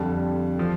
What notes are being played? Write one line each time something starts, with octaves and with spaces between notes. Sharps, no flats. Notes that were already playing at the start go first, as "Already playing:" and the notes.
Already playing: F2 D3 G3 A5
F3